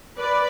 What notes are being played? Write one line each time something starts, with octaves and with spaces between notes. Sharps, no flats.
B4 D5